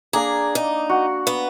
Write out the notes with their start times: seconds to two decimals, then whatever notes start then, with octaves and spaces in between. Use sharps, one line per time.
0.13 A#3 D4 G#4 A#4
0.55 D#4
0.89 F#4
1.27 B3